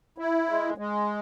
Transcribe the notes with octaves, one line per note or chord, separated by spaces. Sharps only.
E4
G#3
G#3